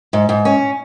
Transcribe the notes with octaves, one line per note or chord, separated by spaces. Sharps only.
G#2
G#2
C#4